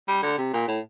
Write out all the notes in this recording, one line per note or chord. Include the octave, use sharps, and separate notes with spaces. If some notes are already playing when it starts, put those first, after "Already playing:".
G3
D3
C3
A#2
A2